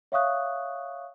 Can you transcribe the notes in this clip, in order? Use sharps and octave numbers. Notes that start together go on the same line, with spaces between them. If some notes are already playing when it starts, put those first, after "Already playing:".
C#5 E5 F5 C#6 D#6 F#6